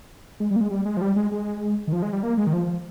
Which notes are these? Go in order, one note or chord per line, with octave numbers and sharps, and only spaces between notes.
G#3
G3
A#3
G#3
G3
G#3
F3
G3
G#3
G#3
D#3
F3
G#3
G3
A#3
G#3
D#3
F3